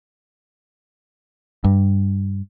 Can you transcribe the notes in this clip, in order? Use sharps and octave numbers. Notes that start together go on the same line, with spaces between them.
G2